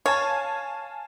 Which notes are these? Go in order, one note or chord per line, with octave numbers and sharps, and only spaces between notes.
C#5 F5 G#5 A5